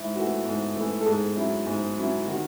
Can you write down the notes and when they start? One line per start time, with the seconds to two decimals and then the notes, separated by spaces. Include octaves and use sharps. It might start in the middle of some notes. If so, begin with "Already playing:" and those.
Already playing: G#2 E4
0.15 E3 A3 F#4
0.45 G#2
0.76 E3 A3
1.01 A4
1.06 G#2 G#4
1.36 F#3 C#4 E4
1.66 G#2
1.97 F#3 C#4 E4
2.27 D#3 F#4